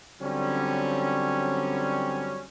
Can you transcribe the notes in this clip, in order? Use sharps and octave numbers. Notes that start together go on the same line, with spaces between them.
D3 F#3 G3 C4 C#4